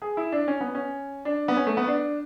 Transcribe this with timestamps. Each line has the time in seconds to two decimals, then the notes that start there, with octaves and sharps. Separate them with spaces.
0.02 G#4
0.17 E4
0.32 D4
0.48 C#4
0.61 B3
0.75 C#4
1.25 D4
1.48 B3
1.57 C#4
1.67 A3
1.77 B3
1.88 D4